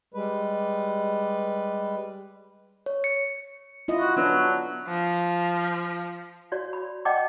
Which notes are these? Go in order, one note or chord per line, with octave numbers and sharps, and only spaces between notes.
G3 G#3 B4
C#5
C#7
E4 F4 D#5
F#4
F#3 B3 D4 B4
F3
F#4 C#5 D5 F5
B5
D5 D#5 F#5 G5 A5 D6